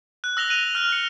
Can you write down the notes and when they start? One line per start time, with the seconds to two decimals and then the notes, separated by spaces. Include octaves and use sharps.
0.24 F#6
0.37 E6 A#6 F7 G7
0.49 F#6 D#7 F7
0.75 F6 F#6
0.92 C#7